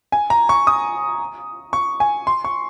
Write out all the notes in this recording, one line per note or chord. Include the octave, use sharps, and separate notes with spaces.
G#5
A#5
C#6
D#6
C#6
G#5
C6
C#6